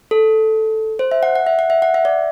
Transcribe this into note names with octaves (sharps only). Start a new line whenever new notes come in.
A4
C5
E5
F#5
F#5
E5
F#5
E5
F#5
E5
D5